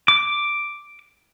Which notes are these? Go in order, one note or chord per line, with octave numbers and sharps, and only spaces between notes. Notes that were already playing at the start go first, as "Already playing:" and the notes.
D6